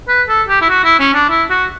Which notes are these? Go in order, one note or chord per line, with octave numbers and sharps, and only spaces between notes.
B4
A4
G4
E4
F#4
E4
C#4
D4
E4
F#4